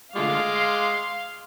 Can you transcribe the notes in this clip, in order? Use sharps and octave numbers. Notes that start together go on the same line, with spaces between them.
D3 G#3 A3 F4 F5 D6
C6